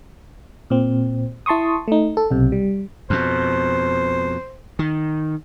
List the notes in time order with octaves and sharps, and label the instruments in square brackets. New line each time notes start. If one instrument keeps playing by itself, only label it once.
[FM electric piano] A#2 C4
E4 A5 C6 C#6 D#6
A3 D#4
A4
B1 C3
G3
[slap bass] F2 B2 [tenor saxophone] C5
[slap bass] D#3